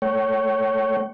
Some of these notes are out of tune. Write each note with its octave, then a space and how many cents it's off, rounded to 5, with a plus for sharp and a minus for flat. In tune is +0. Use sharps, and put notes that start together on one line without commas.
A3 +0 C#5 +0 G5 -40